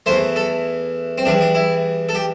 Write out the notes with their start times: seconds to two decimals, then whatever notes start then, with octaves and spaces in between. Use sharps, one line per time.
0.06 E2 E3 A3 C5
0.36 A4
1.18 C4
1.25 E2 E3 G3 D4
1.41 D4
1.55 E4
2.09 A4
2.15 G4